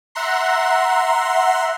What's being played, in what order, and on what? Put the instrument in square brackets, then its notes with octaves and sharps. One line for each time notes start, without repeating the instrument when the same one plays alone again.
[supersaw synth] E5 F#5 A#5 C6